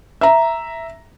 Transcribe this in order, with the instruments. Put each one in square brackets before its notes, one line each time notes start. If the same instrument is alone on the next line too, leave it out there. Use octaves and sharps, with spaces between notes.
[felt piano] E5 A#5